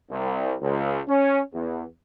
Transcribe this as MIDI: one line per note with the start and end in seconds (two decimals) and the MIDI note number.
0.11 0.55 36
0.61 1.00 37
1.08 1.40 61
1.53 1.84 40